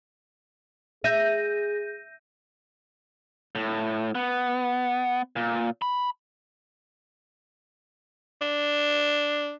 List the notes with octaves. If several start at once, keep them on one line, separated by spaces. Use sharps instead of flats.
G#4 E5 G6 A#6 D#7
A2
B3
A#2
B5
D4